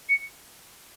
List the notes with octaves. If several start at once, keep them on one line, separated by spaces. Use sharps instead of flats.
C#7